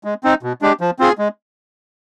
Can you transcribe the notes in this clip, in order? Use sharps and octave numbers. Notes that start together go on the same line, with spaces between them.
G#3
C4 D#4
B2
G#3 D4 G4
F3
C4 F4 G#4
G#3